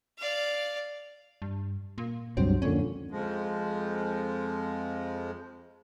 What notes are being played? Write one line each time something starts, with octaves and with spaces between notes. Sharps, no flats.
D5 F5
G2
A#2
C#2 G2 F#3 C4
F2 A#2 D3 C#4
F2 F3 G#3